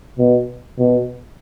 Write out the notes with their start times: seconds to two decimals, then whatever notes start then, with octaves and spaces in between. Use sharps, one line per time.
0.18 B2
0.79 B2